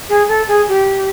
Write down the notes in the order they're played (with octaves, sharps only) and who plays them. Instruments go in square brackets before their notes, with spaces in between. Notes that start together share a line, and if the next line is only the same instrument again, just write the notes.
[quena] G#4
A4
G#4
G4